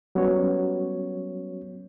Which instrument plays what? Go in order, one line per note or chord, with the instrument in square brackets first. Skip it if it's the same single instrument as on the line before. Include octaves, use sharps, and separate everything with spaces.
[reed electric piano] F#3 G3 B3 C#4 F#4 C#5